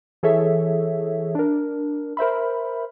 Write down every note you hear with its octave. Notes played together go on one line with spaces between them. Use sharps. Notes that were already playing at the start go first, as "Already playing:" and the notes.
E3 G#4 A4 C#5 E5
D4 A#4
A#4 C5 E5 B5